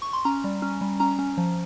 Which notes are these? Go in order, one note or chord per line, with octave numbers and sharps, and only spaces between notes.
C#6
C6
C#4 A#5
G3
C#4
G3
C#4 A#5
C#4
F3